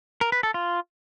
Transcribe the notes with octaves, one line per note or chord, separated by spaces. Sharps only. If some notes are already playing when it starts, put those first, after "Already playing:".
A#4
B4
A4
F4